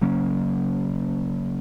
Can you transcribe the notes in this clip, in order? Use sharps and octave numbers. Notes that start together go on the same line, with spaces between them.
C#3 F#3 A#3 C#4